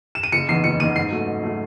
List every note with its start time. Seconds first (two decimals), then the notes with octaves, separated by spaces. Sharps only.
0.15 E7
0.23 D#7
0.32 F#1 C#7
0.49 E2 C7
0.52 D#3
0.64 F#1 C#7
0.79 E2 D#3 D#7
0.96 G#2 C7
1.11 F#3 A3
1.27 G#2
1.43 F#3 A3